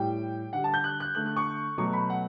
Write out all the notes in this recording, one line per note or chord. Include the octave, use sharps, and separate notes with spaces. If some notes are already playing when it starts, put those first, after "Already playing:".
Already playing: A2 G3 G5
D3 G3 F#5
A5
G6
F#6
F#6
D3 A3 F#6
F#6
C#6
B2 F#3 A3 C#6
B5
F#5